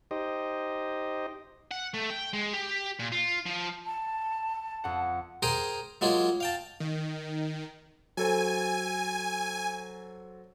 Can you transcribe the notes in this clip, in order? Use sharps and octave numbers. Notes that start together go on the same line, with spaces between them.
D#4 G4 C5 D#5
F#5
A3
G5
G#3
G4
A#2
F4
F3
A5
F2 F#5
G#4 A#4 C5 G5 A#5 D#6
F#3 G#3 A#3 F4 G#4
F5 G5 A5
D#3
F#3 A4 C5 G#5